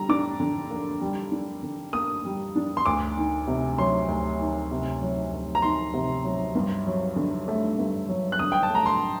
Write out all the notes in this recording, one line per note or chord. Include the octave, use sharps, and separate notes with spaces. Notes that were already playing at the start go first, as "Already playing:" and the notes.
Already playing: D3 G3 A#5
D4 D6
D3
A#3
G3
D4
D3
A#3 D#6
G3
D4
C6
D2 D6
D#3
C3
F#3 C6
D2
D#3
C3
F#3
D2
A#5
D#3 C6
C3
F#3
G2
F#3
D3
A3
G2
F#3
F#6
D3 D#6
G5
A5
A3 A#5
C6